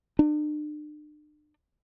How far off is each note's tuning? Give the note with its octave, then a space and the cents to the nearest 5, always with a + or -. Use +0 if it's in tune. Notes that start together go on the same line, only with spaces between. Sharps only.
D4 +40